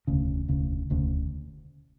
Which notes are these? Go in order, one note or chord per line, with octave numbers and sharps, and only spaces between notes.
E1 D2 C#3
E1 D2 C#3
E1 D2 C#3